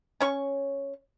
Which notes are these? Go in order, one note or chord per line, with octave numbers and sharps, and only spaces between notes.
C#4 C#5 C#6